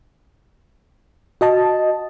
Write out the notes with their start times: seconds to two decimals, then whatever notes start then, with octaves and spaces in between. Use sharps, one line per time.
1.41 F#4 D#5 A5